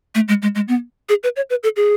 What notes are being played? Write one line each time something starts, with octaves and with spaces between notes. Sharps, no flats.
A3
G#3
G#3
G#3
B3
G#4
B4
C#5
B4
A4
G#4